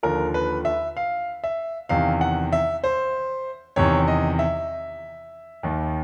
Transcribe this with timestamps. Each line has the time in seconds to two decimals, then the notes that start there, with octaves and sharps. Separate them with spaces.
0.03 D#2 D3 F3 A#4
0.34 B4
0.65 E5
0.97 F5
1.44 E5
1.89 E2 C3 D#3 F5
2.21 F#5
2.53 E5
2.84 C5
3.76 E2 C3 D#3 C#5
4.08 D#5
4.39 E5
5.63 D#2 D#3